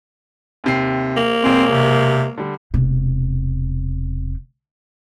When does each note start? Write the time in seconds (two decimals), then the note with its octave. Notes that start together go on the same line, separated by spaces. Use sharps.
0.64 D#2 C3 C7
1.17 A#3
1.44 E1 C4 G#4 C#5
1.71 C3
2.38 D3 G3
2.74 E1 C3